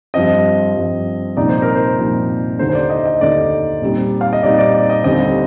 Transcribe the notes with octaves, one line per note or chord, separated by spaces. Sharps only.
G2 F3 C4 D#5
G2 F3 C4
C2 A#2 F3 C4 D#4 D5
C5
A#4
C5
C2 A#2 F3 C4 D#4
D#2 D3 A3 D#4 C5
C5
D5
D#5
D#5
D#2 D3 A3 D#4 D5
A#2 G3 C4 D#4
F5
D#5
A#2 G3 C4 D#4 D5
D5
D5
D#5
D#2 D3 G3 C4 D#4 D#5